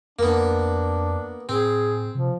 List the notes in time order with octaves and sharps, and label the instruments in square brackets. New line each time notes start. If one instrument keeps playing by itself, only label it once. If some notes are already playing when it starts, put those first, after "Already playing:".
[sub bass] F2 [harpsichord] A#3 B3 [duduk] D4
[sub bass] A2 [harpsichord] C4 [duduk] G#4
[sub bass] C3 [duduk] F3